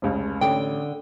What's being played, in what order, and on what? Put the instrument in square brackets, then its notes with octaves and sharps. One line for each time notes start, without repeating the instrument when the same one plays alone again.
[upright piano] F1 C#2 C#3
[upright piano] A1 [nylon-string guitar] D3 [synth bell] G5